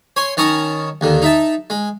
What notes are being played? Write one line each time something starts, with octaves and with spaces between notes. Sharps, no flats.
C#5 G#5 C6
D#3 C#4 A5 A#5 C#6 D#6
D#2 D3 D#3
D#4 E5 A5
G#3